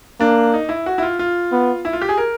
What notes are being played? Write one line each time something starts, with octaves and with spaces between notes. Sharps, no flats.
A#3 D4
D#4
E4
F#4
E4
F4
F4
B3
E4
F4
G4
G#4
A#4